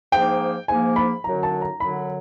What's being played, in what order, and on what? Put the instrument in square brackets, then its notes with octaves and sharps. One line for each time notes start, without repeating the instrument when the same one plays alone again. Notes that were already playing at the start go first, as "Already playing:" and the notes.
[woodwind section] G#2 F3 A#3 [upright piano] G5
[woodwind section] G#2 F3 A#3 [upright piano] G#5
[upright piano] B5
[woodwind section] F#2 D3 F#3 [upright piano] A#5
[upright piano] A5
A#5
[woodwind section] F#2 D3 F#3 [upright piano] B5